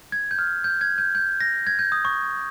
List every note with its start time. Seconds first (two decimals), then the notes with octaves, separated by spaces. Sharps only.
0.12 G#6
0.31 G6
0.39 F6
0.64 G6
0.81 G#6
0.98 G6
1.15 G6
1.40 A#6
1.67 G#6
1.79 G6
1.92 D#6
2.05 C#6